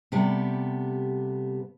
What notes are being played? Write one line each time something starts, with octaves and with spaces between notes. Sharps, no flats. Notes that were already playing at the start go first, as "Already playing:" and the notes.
C3 G3 A3 B3